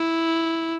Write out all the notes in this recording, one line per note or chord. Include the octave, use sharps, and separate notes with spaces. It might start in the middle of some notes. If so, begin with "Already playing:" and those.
Already playing: E4